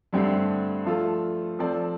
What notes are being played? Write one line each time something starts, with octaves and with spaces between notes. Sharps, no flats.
G2 D3 A3 C4 G4
F3 A3 F4 A4
F3 C4 A4 D5